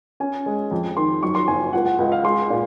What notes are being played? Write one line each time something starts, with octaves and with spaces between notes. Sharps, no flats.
C#4 G#5
G#3
F2
D#3 C6
F#2 C#6
C6
F#1 G#5
C#2 F#5
F#5
C#2 D#5
F5
G#3 C6
A#2